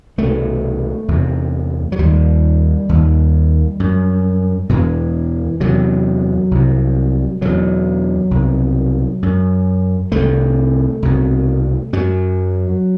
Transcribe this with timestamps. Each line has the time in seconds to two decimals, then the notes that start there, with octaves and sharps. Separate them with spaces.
0.18 C2 B2 A3
1.08 E2 C3
1.92 F#3
1.99 D#2 G3
2.89 D#2
3.80 F#2
4.69 E2 B2 E3
5.60 E2 C3 F#3
6.51 C2 C3
7.41 E2 B2 F#3
8.31 C2 B2
9.23 F#2
10.12 C2 C3 A3
11.03 C2 B2
11.93 F#2 F#3